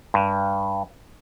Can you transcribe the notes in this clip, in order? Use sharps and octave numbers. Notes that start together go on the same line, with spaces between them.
G2